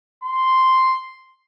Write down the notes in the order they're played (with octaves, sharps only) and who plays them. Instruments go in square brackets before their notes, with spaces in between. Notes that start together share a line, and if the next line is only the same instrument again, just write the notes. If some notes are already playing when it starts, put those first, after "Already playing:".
[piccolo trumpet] C6